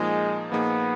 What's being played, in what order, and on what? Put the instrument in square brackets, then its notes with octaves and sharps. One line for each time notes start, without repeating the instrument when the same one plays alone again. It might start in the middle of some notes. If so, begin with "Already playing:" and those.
Already playing: [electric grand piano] A#2 F3 A#3 D#4 G#4 [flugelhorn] G#3
[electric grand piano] A#2 F3 A#3 D#4 G#4 [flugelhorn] B3